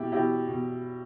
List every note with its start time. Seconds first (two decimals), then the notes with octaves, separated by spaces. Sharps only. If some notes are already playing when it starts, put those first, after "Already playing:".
Already playing: B2 E4 G4
0.12 B2 E4 G4
0.49 B2